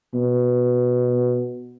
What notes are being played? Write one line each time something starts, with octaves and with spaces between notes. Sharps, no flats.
B2